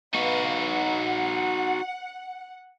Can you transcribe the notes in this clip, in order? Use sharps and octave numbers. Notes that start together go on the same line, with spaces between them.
D#4 F#4 B4 F5
F#5